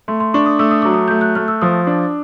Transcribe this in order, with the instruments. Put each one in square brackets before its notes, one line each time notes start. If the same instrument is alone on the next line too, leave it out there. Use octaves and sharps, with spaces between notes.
[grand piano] A3 [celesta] C6
[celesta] C6
[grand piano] D4 [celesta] C#6
[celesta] D#6
[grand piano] A3 [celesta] E6
[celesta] D#6
[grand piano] F#3 [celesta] D6
[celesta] D#6
[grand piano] A3 [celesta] G6
[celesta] F#6
[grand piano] A3 [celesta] F6
[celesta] E6
[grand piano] F3 [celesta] D#6
[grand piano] D4